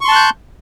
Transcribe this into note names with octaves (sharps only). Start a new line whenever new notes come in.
A5 C6 C#6 F#6 G6